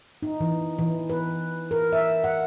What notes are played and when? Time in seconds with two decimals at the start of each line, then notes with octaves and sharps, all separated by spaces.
0.23 D#4
0.41 E3
0.79 E3
1.10 B4
1.71 A#4
1.93 E5
2.24 F#5